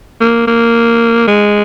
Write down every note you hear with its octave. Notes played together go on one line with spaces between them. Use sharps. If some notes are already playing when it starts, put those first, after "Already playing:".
A#3
A#3
G#3